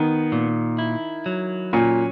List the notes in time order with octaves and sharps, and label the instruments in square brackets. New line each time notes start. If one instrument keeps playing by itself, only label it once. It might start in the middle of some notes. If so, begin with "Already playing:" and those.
Already playing: [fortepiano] D#3 [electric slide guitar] B3
[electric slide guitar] A#2
E4
F#3
[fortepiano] A#2 [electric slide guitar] C#4